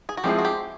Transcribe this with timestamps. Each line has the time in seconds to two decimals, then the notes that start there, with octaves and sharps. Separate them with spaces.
0.09 G#4
0.17 F#4
0.24 F3 G#3 C4 E4 G4 G#4
0.39 F#4
0.45 G4